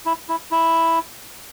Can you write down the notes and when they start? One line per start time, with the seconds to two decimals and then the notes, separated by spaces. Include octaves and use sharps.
0.06 E4
0.29 E4
0.51 E4